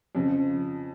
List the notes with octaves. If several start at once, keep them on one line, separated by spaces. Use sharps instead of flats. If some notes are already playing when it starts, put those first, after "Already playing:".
F2 C#3 F3